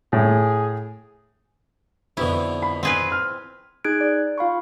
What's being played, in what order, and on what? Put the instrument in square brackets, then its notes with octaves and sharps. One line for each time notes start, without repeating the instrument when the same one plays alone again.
[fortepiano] A2 [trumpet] G#4
[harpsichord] F2 B2 D3 [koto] E4
[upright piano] B5
[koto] C4 G#4 B4
[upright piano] F6
[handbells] D#4 G#4 F#6 G#6 D7
D5
F4 F5 B5 C#6